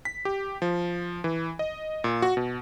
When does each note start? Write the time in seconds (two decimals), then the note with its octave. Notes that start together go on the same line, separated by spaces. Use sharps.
0.05 B6
0.25 G4
0.62 F3
1.24 E3
1.59 D#5
2.04 A#2
2.22 F#4
2.37 B2